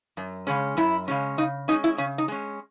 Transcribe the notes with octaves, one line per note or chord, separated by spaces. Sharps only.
F#2
C#3 G#3 C#4
F#2 E4
C#3 G#3 C#4
C#3 D#4
G#3 C#4 D#4
E4
C#3 C#4
D#4
G#3 C#4